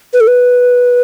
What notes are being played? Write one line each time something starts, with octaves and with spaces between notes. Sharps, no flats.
B4
A4
B4